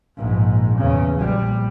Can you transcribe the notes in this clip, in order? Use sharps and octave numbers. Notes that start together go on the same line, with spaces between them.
A#1 G#2
E2 C#3
A#1 G3